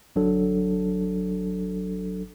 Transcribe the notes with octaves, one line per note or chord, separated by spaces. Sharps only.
G1 F#3 D4 A4